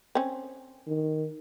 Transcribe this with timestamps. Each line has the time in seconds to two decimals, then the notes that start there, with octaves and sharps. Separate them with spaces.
0.15 C4 C#4
0.87 D#3